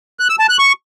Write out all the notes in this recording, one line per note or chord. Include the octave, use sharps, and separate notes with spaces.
F#6
E6
A5
F#6
C#6